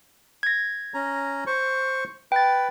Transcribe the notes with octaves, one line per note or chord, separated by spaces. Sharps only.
G#6 A#6
C#4 A#5
C5 C#6
B4 G5 A6